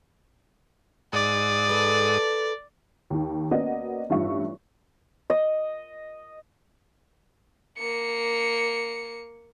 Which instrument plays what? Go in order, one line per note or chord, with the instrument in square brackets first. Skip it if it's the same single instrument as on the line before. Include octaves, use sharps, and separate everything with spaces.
[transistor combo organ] G#2 D#6 [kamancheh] D5
[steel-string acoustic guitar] A4 B4
[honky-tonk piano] D#2 D#3
A#3 B3 C#4 F#4 D5 D#5
A1 G2 D#4 F4 E5 C#6
[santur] D#5
[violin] A#3 C#7